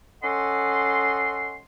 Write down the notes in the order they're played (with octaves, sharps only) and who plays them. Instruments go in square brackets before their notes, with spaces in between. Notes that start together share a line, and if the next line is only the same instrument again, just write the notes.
[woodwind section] C#4 A4 D#5 F#5 C6